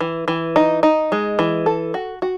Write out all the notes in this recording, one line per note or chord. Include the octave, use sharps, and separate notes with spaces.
E3
E3
D#4
D#4
G#3
E3
A4
F#4
F#4